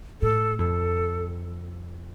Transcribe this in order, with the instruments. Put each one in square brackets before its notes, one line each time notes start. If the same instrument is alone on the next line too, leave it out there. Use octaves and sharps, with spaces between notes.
[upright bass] A2 [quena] A4
[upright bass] F2 [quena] A4